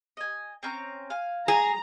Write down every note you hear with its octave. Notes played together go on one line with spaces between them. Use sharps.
D#5 G#5
C4 C#4 A#5
F5 G#5
G#4 A#5